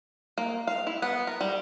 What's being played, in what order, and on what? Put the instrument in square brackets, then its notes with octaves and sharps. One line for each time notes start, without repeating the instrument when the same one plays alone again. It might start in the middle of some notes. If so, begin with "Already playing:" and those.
[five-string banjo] A#3
F5
E4
B3
A#4
G3